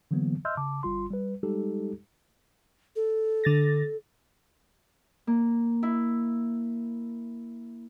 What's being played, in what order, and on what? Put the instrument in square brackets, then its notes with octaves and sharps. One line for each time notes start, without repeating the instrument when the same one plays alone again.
[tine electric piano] D3 E3 F#3 A#3 B3
D#5 E5 C6 E6 F6 G6
C#3 A5 D6
G1 G3 F4 C6
G3 B4
G3 G#3 D#4 G4 A4
[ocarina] A4
[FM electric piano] D3 A6 A#6
[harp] A#3
E4